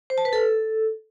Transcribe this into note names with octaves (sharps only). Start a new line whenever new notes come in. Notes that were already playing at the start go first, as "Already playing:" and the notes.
C5
A5
B4
A4